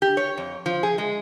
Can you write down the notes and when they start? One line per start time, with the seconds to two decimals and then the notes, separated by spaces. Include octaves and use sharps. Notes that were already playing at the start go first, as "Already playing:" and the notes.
0.02 G4
0.17 C#5
0.37 F2
0.66 F3
0.83 G#4
0.98 G#3